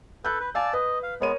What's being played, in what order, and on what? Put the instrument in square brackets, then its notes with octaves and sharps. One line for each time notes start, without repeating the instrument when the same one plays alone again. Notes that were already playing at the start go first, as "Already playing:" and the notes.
[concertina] A4 B4 [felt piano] F#6 G6
[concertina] B4
[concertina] D5 A5 E6 [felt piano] F5 G#5
[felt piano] B4 [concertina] D#5
[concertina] F5
[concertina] G#3 B3 [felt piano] A#4 C#5 D#7